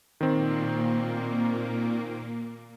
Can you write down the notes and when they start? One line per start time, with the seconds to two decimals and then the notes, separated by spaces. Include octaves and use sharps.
0.21 A#2 D#3 A#3 C4